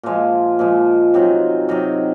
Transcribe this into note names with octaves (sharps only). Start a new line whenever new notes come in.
A#2 F3 G#3
A#2 F3 G#3
C3 D#3 F#3
C3 D#3 F#3